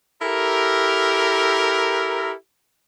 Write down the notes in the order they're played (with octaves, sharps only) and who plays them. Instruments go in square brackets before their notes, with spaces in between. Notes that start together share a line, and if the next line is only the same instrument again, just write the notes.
[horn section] E4 G4 A4 A#4